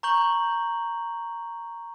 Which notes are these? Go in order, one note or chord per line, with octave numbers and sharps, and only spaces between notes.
A#5 C#6 G6 F#7